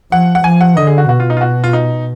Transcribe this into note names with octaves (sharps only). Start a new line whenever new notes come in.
F3 F#5
F#5
F3 G#5
F#5
D3 D#5
G#4
F#4
B2 F#4
F4
D#4
F4
F#4
F4
D#4